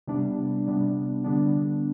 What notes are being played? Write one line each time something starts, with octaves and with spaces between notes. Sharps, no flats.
C3 G3 B3 D4
C3 G3 B3 D4
D3 G3 B3 D4